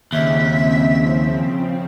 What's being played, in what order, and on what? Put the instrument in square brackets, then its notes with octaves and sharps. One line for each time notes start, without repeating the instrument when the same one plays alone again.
[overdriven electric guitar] D#2 [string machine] C#3 F3 C4 [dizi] E5